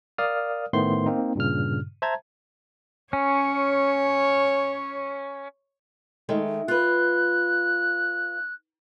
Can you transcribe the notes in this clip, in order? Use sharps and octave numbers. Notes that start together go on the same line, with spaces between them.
A#4 D5 F5 D#6 F6
A2 D#3 A3 B3 C5 C6
A#3 C4 D#4
G2 A#2 C#3 F6
C5 E5 A5 A#5 G#6
C#4 C#5
D#3 G#3 A3
F4 B4 F#6